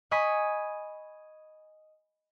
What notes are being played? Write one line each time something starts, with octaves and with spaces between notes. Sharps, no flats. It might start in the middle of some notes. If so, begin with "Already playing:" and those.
D#5 G#5 B5 C#6 D#6 B6